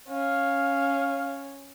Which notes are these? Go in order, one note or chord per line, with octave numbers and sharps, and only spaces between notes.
C#4 F5